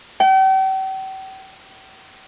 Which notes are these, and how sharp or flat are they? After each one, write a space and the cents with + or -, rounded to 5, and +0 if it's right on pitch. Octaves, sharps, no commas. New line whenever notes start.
G5 -40